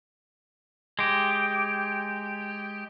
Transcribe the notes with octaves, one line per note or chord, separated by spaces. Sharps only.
G#3 G4